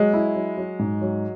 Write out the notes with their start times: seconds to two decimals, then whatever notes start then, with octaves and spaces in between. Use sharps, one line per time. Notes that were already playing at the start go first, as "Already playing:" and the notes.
Already playing: F#3 G#3
0.13 E4
0.35 F#3
0.57 F#3
0.79 G#2
1.01 F#3